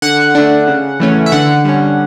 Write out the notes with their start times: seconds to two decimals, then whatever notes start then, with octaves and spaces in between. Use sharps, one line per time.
0.02 D3 F#5
0.35 A3 D4
0.67 C#3
1.00 E3 A3 C#4
1.26 E5
1.32 D3 F#5
1.65 G3 C#4